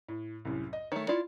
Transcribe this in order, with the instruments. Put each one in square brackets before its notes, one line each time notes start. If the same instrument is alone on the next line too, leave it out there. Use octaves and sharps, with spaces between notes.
[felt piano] A2
C2 F#2 A2
D#5
[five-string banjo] D#3 A3 [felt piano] C#5
[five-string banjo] E4 F4 D5